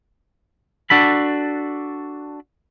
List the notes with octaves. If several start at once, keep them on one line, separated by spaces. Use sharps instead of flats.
D4 F#4 A4 B5